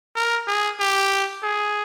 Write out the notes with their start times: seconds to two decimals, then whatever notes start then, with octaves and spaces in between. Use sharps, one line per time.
0.16 A#4
0.48 G#4
0.80 G4
1.43 G#4